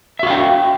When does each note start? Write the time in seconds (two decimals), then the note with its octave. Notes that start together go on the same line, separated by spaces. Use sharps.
0.19 E5
0.23 F#4
0.27 F5
0.30 G5